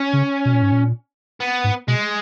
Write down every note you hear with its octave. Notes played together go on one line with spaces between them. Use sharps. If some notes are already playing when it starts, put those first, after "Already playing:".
Already playing: C#4
C#3
B2
A#2
G#2
A#2
B3
G#2
B2 G#3